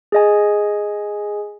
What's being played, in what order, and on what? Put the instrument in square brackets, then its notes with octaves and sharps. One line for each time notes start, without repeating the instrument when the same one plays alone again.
[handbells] G#4 D#5 G#5